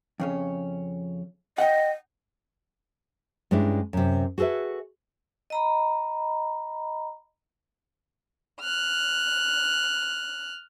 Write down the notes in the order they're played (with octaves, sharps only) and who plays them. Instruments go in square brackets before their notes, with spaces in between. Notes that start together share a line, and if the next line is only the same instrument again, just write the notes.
[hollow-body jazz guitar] F2 C#3 C#4
[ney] D#5 [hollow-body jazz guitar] F#5 G5
[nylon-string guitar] G2 G#3 C#4 D4 E4
F#2 C3
F#4 G#4 A4 B4 E5
[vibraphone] D#5 A#5 B5
[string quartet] F6 F#6